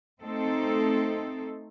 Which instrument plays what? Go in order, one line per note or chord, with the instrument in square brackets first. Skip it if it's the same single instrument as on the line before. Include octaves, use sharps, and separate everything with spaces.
[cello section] A3 C4 D#4 A4